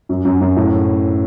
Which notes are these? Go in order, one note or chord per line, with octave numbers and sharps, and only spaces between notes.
F#2
F#2
F#2
A2